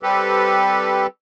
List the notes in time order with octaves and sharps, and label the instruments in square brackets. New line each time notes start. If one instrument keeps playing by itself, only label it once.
[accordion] G3 C4 G4 A4 B4